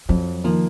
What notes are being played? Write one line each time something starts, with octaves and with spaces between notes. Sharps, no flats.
F2 F#3
D#3 F3 A#3